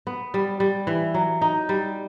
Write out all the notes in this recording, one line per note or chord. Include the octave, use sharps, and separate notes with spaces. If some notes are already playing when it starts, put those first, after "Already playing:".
B3
G3
G3
E3
F#3
D#4
G3